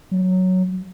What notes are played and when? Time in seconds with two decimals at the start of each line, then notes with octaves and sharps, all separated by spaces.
0.11 F#3